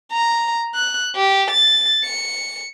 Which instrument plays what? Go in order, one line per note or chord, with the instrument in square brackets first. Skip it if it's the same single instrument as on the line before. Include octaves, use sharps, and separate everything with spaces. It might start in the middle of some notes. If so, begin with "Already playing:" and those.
[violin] A#5
F#6
G4
A6
C#7